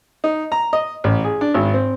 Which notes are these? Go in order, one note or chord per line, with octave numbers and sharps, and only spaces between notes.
D#4
A#5
D#5
A1
G#4
D4
G#1
C4